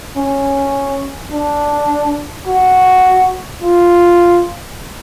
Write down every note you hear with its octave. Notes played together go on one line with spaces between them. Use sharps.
C#4
D4
F#4
F4